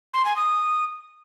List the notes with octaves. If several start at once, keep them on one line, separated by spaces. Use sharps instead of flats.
C6
G#5
D#6